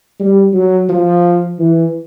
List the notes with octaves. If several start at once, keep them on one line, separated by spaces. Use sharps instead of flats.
G3
F#3
F3
E3